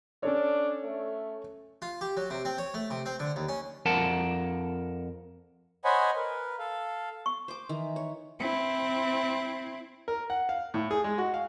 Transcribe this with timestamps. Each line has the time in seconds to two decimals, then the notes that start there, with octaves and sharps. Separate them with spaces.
0.23 C#4 D4 A4 C#5
0.83 A3
1.82 F4
2.01 G4
2.17 F#3
2.30 C3
2.45 C4
2.58 C#5
2.74 A3
2.90 C3
3.06 C4
3.20 D3
3.36 D#2
3.49 C#4
3.86 F2 A#4 F#5 A5
5.85 C5 C#5 D#5 F#5 G#5 B5
6.16 A#4 B4
6.59 A4 F5
7.26 C#6
7.48 C5 D6
7.69 D#3 E3
7.96 C#5
8.40 C4 E4
10.08 A#4
10.30 F#5
10.49 F5
10.74 A2
10.91 G#4
11.04 G#3
11.18 F#4
11.34 F5